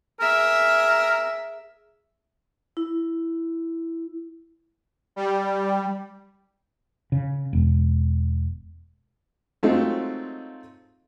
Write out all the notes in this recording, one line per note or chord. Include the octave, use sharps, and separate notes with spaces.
G#4 A#4 E5
E4
G3
C#3
E1
F#3 G#3 A3 C4 D#4 F4